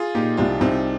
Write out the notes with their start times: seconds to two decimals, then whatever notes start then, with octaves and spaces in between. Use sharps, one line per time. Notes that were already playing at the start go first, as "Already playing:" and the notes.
Already playing: F4 G#4
0.15 A#2 D#4 G4
0.37 C2 D4 F4
0.60 C2 C4 D#4